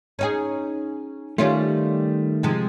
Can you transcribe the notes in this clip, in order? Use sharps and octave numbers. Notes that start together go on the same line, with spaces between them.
C#4 D#4 G#4
D#3 G3 A3 C#4 F4
C3 F3 G#3